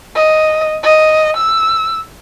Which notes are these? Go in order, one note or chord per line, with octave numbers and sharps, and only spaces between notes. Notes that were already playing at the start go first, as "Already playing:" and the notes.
D#5
D#5
E6